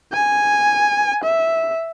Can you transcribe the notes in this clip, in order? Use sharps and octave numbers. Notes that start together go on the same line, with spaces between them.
G#5
E5